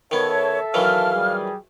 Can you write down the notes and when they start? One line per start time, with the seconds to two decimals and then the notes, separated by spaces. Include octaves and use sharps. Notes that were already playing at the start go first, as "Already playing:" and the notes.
0.11 D#3 B3 A4 C#5 E5 A5
0.74 D#3 E3 F#3 F5 F6
1.13 G3 G#4